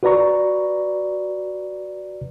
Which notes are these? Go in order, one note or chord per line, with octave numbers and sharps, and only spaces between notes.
F#4 B4 D5 A#5 C#6